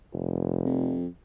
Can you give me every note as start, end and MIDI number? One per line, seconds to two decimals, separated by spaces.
0.13 0.97 29
0.66 1.06 41